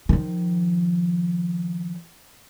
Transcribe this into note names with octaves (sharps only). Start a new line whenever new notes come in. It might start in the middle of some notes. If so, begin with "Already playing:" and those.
D#3 F3